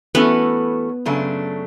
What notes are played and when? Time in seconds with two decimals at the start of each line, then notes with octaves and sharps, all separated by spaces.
0.15 E3 A3 B3 C#4 F#4 A4
1.06 F#2 C#3 F#3 A3 D4